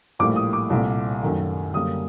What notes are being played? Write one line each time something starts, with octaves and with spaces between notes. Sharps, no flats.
A#1 A2 G3 A#3 D6
D#6
D6
C2 A#2 A3
F#2 D#3 A3
F#2 D3 G3 A#3 D#6